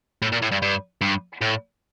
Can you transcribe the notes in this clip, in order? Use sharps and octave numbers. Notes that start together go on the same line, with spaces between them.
A2
A#2
A2
G2
G2
G2
A2